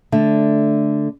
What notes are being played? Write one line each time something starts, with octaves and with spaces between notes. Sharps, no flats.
D3 A3 D4